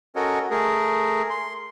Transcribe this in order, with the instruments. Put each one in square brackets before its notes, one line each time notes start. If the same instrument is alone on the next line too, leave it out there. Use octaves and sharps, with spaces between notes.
[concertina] C#4 F#4 A4 A#4 C#5 D#5
A3 G#4 A#4
C6